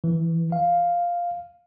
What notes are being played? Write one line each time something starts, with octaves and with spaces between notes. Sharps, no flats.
E3
F5